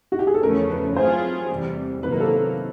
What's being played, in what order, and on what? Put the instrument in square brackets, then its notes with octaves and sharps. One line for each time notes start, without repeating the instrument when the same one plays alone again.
[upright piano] F#4
G4
G#4
A4
[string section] E2 C#3 F3 A3 C#4 [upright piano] A#4
[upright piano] B4
[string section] F#3 A3 C4 F4 G#4 [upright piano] C5
[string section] E2 C3 E3 G3
[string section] C3 D#3 F#3 A#3 [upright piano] B4
[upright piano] A#4
A4
A#4